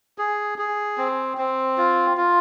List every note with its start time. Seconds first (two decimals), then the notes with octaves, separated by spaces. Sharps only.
0.18 G#4
0.58 G#4
0.98 C4
1.38 C4
1.78 F4
2.17 F4